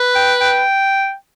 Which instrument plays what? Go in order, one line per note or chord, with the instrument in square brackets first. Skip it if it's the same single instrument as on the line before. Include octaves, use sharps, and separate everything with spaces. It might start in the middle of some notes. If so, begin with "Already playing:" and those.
Already playing: [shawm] B4
[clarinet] G5
G5